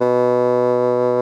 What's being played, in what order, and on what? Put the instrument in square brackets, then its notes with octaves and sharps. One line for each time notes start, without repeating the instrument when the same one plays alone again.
[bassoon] B2